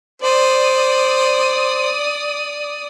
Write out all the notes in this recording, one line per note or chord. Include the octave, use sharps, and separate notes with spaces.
C5 D5 D#6